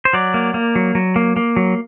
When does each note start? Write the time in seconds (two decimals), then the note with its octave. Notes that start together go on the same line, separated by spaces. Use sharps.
0.05 C5
0.13 F#3 D5
0.34 A#3
0.54 A#3
0.76 F#3
0.95 F#3
1.16 A#3
1.36 A#3
1.56 F#3